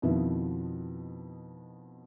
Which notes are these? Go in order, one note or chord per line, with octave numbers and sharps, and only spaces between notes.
F2 B2 D#3 F3 B3 E4